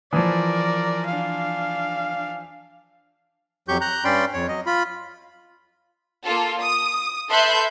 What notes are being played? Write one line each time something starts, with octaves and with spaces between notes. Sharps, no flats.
E3 F3 A#4 D5
D4 F5
F2 F#3 G4 C#6 G6
A#5 F#6 G6
G2 C#4 D5 G5 B5 C6
F2 C#5
F#3 D#5
F4 B5
A#3 F4 A4
D#6
A4 B4 E5 C6 F#6 G6